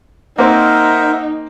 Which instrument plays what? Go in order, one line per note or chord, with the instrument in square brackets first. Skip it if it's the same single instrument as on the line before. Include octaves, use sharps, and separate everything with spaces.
[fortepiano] A#3 C4 [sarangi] D#4 [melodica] A#4 C5 E5 [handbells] F#5 A#6